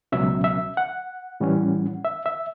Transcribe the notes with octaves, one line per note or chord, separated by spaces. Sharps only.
C#2 B2 F#3 C#4 E5
E5
F#5
A2 E3 G3 C#4
E5
E5